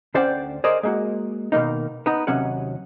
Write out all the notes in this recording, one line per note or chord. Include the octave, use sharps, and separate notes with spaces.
D2 C#4 C5 D5 F#5 G5
G#4 A#4 C5 D5 D#5
G#3 A#3 F#4
B2 D#3 A#3 D#4
B3 D#4 A#5
D#2 C3 F#3 C#4 F#5